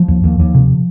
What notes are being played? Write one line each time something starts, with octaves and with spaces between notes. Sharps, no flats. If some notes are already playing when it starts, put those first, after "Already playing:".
Already playing: F3
D#2
D#2
D#2
C3